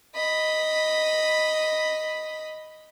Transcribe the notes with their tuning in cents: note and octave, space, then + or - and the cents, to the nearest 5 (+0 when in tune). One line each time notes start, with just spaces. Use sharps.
D#5 +0 B5 +0